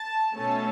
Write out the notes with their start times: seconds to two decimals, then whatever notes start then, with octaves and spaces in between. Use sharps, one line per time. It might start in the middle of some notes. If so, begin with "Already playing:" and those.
Already playing: A5
0.35 B2 A3 C#4 A5